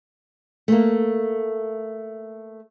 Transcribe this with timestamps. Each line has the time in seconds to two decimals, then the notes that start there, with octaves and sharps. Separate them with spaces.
0.68 A3 A#3